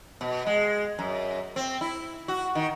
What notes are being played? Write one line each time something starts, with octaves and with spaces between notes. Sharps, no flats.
B2
G#3
F#2
C4
E4
F#4
D#3